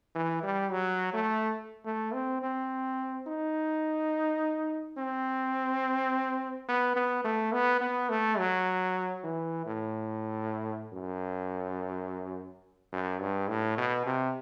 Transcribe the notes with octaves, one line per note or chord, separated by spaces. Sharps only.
E3
G3
F#3
A3
A3
C4
C4
D#4
C4
B3
B3
A3
B3
B3
A3
F#3
E3
A2
F#2
F#2
G2
A2
B2
C3